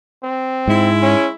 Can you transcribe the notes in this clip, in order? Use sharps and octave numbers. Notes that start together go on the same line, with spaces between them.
C4
G#2 G#3 E4
C#4